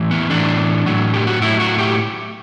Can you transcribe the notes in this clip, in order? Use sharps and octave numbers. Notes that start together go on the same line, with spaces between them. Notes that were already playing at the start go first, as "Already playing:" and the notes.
Already playing: A2 E3
B3
A2 E3 D4
A2 F#3
G4
F#4
A2 F#3 E4
F#4
G4